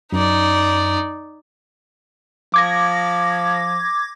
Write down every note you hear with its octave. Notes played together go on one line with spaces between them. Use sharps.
F#2 D#4 D5
F3 D6 G#6 A#6